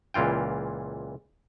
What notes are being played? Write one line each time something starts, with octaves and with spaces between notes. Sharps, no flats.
C#2 A#2 E3 F4 G5